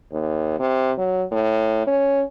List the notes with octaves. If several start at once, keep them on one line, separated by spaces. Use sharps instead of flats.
D#2
C3
F#3
A2
C#4